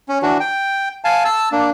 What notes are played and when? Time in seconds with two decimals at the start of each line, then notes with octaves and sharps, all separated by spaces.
0.09 C#4
0.22 E3 D4 F#4
0.40 G5
1.05 F5 G#5 A5
1.25 A5 E6
1.52 A#3 D4